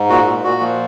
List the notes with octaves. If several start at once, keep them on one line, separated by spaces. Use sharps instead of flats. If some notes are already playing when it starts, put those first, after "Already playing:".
Already playing: G#2
A#2 F#4
A#2
A#2 F#4
F3